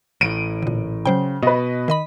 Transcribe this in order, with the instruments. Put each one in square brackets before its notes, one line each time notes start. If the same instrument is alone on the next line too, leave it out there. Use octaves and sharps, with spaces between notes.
[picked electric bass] A1 A2 [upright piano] D7 D#7
[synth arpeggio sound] A#2 D3
[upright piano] C#3 [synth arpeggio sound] F#3 C5 G5
[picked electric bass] B2 [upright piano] B4 D#5
[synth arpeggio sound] D#3 D#5 B5